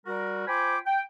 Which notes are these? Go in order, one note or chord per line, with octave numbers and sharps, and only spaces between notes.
G3 F#4 A#4
F4 C5 G5 G#5 B5 D6
G5